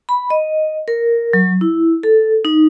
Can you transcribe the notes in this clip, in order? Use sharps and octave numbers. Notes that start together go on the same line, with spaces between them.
B5
D#5
A#4
F#3
E4
A4
D#4